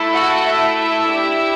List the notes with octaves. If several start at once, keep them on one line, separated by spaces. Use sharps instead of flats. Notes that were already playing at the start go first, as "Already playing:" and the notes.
Already playing: A3 E4 A4
F#4 F#5
E4 E5
D4 G4